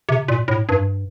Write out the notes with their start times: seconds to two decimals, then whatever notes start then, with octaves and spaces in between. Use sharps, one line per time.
0.09 C3
0.28 A#2
0.48 A2
0.69 G2